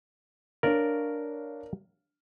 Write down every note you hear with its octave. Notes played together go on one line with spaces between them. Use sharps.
D4 A#4 C#5 D5 F5